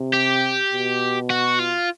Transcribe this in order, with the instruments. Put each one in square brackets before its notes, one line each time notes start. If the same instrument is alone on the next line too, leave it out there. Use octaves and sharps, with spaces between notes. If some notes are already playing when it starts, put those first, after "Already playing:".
Already playing: [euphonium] C3
[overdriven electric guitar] G4
[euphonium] B2
[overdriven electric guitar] F#4
F4